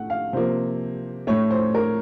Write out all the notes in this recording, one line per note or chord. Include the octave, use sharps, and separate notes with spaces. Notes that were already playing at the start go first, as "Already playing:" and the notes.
Already playing: A2 A3 F#5
F5
C3 F3 A#3 C5
A2 A3 C#5
C5
A#4